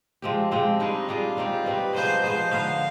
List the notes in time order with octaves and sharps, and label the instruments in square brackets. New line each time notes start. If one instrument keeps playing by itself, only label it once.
[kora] F3 G#3 C4 G4
F3 G#3 C4 G4
[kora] G3 D4 G#4 [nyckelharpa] D#4
[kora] G3 D4 G#4 [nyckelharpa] F4
[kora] G3 C4 D#4 G4
[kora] G3 C4 D#4 G4 [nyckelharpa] B4
[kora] F3 B3 D#4 G#4 [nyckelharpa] C5
[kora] F3 B3 D#4 G#4 [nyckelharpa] C5
[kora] D3 F3 B3 D#4 [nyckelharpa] F5